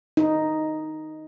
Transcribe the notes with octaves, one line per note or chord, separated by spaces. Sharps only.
D#4